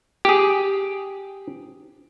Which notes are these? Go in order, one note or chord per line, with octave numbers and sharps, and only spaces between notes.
G4 G#4